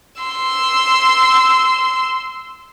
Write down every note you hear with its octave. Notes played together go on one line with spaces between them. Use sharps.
C6 E6